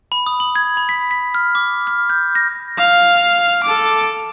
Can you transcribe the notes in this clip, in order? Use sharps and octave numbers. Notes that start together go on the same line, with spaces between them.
B5
D#6
F#7
G#6
B5
B6
B6
F6
D6
F6
G6
A#6
F5
A4 D6